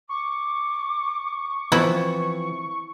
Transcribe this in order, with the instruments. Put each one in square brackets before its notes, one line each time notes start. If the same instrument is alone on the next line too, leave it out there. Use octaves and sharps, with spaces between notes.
[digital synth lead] C#6 [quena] D6
[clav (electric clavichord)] E3 F3 C4 [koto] B3 E4 F#4